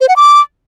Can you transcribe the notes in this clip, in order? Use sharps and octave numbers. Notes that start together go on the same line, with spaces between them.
C5
F#5
D6